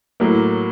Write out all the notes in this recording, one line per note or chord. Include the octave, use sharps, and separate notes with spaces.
A2 F#3 A#3